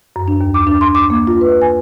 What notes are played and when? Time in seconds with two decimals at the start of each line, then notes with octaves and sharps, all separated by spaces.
0.16 F#2
0.28 D4
0.41 D#2
0.54 D6
0.67 D4
0.81 C6
0.95 D6
1.10 A#3
1.27 F4
1.41 B4
1.61 G#5